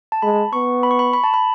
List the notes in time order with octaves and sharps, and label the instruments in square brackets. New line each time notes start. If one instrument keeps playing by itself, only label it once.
[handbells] A5
[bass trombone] G#3 [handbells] B5
[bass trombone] B3 [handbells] C#6
[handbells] B5
C#6
B5
B5
A5
B5